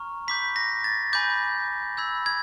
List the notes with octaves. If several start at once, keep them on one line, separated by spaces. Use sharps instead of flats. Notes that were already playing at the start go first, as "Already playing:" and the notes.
Already playing: A#5 C#6 F6
B5 D6 G6 B6
A#6
A6
G#5 B5 D6 G6
B5 E6 G6 G#6
G#6